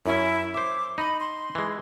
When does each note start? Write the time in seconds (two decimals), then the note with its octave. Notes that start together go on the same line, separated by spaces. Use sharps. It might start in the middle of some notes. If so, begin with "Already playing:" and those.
0.06 F#2 C#4 E4
0.54 C5 E5 D6
0.98 D#4 D#5 B5
1.20 C6
1.55 E3 G#3